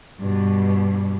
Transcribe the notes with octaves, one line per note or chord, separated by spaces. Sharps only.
G2 B2